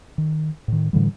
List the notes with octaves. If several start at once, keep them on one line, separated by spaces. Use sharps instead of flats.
D#3
A2 D#3
A2 D3 E3 G3